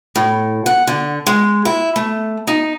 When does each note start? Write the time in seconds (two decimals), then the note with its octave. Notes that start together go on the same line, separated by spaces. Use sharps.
0.16 A2
0.66 F#5
0.87 D3
1.27 G#3
1.65 E4
1.96 A3
2.47 D#4